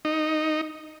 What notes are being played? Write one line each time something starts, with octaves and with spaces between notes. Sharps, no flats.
D#4